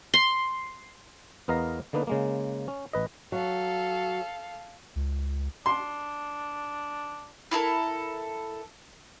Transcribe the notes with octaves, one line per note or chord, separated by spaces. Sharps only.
C6
E2 B3 A#4 D#5 F5 A#5
D3 A#3 B3 D#4 B4
C#3 G#3 A#3
C#4
A1 B4 D#5
F#3 A4 F5
C#2
D4 C6
E4 F4 A4 A#4